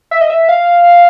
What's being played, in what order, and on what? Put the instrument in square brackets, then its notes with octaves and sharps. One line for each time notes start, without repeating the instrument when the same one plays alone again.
[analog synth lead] E5
D#5
E5
F5